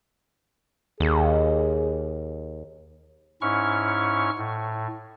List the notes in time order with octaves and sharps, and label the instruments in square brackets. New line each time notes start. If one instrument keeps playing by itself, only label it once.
[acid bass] D#2 [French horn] G#4
[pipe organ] G#2 C#4 E4 C#6 F6
A2